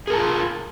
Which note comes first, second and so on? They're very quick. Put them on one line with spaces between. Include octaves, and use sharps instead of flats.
G#4 A#4 A5 F4